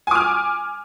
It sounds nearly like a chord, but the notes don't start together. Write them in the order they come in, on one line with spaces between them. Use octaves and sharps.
G#5 D6 F6